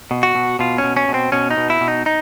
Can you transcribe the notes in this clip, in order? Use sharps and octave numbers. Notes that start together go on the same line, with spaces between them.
B2
F#4
B2
B2 F4
C#4
B2
C#4
B2
C4
B2 C#4
D#4
B2
E4
B2
D#4
D#4